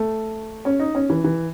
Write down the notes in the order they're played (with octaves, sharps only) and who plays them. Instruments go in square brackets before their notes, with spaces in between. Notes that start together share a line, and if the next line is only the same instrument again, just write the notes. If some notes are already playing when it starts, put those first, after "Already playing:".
Already playing: [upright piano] A3
C#4
D#4
C#4
E3
E3